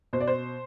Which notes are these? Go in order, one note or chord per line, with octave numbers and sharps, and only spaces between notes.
B2 C5
D5
C5